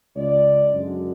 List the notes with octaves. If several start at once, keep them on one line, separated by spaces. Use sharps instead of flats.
C#2 C#3 G#3 D5
F#2 D3 G#3